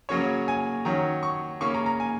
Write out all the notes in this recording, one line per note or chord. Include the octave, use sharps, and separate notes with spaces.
C#3 F#3 A#3 C#4 C#5
G#5
D#3 F#3 C#4 A#5
C#6
C#3 A#3 C#4 C#6
A#5
A#5
G#5